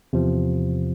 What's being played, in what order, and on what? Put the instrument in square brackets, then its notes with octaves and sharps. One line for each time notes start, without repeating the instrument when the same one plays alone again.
[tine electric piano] E2 C3 F3